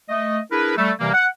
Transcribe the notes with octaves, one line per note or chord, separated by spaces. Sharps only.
A3 D#5
D4 E4 G#4 A#4 B4
G3 A3
C3 E3 G3 A#3
F#5